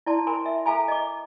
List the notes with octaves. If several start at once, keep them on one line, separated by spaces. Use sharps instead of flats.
E4 D5 A5 C6
A#4 G#5 B5 C6
E5
A4 E5 F5 G#5 A#5 B5
D#5 D6